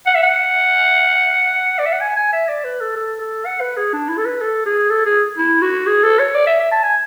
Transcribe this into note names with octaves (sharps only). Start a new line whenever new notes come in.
F#5
E5
F#5
D5
E5
F#5
G#5
G#5
E5
D5
B4
A4
A4
A4
F#5
B4
G#4
D4
E4
A4
B4
A4
G#4
A4
G#4
E4
F#4
G#4
A4
C#5
D5
E5
E5
A5
G#5